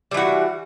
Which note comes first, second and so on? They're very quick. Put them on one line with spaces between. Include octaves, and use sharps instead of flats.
G3 E3 F#4